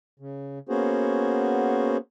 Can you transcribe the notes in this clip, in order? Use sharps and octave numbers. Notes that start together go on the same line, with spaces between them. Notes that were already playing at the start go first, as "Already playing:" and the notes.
C#3
A#3 B3 C#4 F#4 G#4 C5